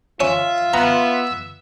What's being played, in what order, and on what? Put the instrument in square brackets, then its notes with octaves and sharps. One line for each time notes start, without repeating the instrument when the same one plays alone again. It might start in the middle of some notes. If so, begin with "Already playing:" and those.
[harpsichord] C#4 [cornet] F4 [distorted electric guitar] E5
[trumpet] B3 [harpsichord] A#5